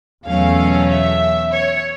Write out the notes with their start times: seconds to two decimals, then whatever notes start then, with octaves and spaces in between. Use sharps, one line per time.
0.24 E2 B2 F#3 A3 C#4 F5
0.88 E5
1.51 C#5